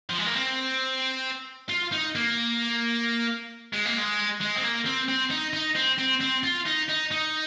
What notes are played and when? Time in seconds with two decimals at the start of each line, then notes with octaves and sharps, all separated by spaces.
0.10 F3
0.18 G#3
0.26 A#3
0.35 C4
1.70 F4
1.92 D#4
2.15 A#3
3.73 G#3
3.85 A#3
3.98 G#3
4.40 G#3
4.57 C4
4.63 A#3
4.85 C4
5.08 C4
5.31 D#4
5.53 D#4
5.76 C4
5.99 C4
6.21 C4
6.43 F4
6.66 D#4
6.89 D#4
7.11 D#4